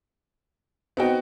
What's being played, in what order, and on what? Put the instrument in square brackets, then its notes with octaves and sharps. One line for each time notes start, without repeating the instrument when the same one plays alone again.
[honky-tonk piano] B3 D#4 F#4 [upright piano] C4 D#5 G5